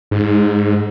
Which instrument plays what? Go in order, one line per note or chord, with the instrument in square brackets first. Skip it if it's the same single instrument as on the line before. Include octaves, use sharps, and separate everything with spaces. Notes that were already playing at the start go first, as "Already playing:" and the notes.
[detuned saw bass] G#2